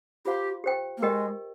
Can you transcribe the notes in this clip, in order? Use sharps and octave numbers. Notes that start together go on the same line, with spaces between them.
F4 G4 C5 F5 C6
G4 C5 G5
A#3
G#3 G4 A#4 D#5 G5